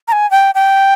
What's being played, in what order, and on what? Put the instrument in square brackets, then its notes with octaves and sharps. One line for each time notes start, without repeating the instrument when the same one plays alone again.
[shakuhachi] A#5
G#5
G5
G5